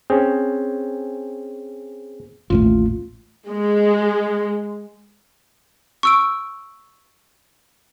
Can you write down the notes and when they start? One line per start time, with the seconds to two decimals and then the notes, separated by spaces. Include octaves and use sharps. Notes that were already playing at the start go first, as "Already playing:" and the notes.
0.10 C4 C#4 G#4
2.50 A1 D#2 A2 A3 F4
3.50 G#3
6.03 C#6 E6 D7